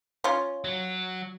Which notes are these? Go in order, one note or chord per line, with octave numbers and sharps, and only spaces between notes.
C#4 F4
F#3